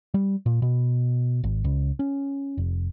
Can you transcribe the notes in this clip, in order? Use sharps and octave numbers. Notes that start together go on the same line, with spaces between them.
G3
A#2
B2
G#1
C#2
C#4
F1